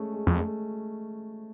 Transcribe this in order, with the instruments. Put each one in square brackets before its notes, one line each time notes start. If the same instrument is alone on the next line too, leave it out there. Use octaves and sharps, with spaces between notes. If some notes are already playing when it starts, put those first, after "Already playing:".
Already playing: [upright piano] G#3 A3 C#4
G#3
[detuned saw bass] F2
[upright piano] A3